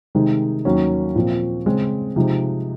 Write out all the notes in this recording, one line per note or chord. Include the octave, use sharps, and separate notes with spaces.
C3 D#3 G#3 D#4
D#2 D#3 F#3 C#4
A#2 F3 C4 F4
C#3 G#3 C4
C3 F3 G#3 D#4